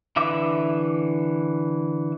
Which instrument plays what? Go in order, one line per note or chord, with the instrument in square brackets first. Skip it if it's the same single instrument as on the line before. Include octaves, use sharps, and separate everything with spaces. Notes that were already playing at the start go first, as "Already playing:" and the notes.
[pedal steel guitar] D3 E3 E5 D6